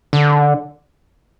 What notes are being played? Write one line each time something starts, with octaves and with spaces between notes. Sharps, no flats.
D3